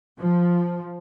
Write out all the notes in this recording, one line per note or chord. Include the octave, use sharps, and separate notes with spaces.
F3